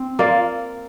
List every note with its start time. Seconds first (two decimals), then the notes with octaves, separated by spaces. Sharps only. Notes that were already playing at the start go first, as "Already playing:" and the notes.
Already playing: C4
0.19 A#3 F4 D5 F5